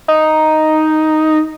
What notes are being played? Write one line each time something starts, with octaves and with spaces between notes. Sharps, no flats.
D#4